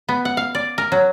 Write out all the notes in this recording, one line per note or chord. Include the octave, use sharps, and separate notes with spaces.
B3
F#5
F5
D5
A#4
F#3